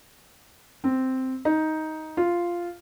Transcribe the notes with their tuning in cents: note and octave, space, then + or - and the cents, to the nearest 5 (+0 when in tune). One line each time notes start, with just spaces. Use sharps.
C4 -5
D#4 +10
F4 -5